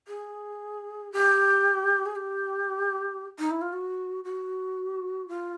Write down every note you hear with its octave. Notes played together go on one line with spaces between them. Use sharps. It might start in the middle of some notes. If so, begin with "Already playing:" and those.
G#4
G4
G#4
G4
D#4
E4
F4
F#4
F#4
F4